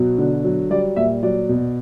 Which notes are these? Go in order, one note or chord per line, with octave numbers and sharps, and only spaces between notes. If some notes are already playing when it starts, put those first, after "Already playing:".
Already playing: B2 F#3
D3
F#3
G3 D5
A#2 E5
F#3 D5
B2